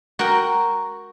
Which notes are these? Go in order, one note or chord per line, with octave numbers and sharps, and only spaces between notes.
F#4 A#4 F#5 G5